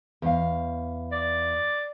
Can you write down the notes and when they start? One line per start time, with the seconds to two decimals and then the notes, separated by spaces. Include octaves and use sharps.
0.22 E2 F5
1.12 D5